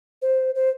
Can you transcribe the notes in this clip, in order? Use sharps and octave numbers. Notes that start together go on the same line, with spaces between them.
C5
C5